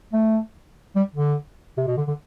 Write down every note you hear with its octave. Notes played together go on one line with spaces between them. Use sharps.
A3
G3
D3
C3
B2
D3
D3